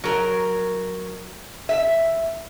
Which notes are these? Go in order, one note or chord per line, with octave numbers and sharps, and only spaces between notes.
F#3 A#4
E5